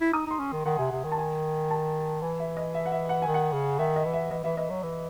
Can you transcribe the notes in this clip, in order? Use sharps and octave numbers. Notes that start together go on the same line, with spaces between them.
E4
D#4 D#6
D#4 C6
C#4
D#3
D#3 F#5
C3 G#5
C3 F#5
D#3
A5
G#5
A5
E3 G#5
E5
D#5
E5
F#5
E5
F#5
D#3 G#5
F#5
C#3
D#3 E5
D#5
E3
E5
E3 D#5
E3 E5
E3 D#5
F#3
E3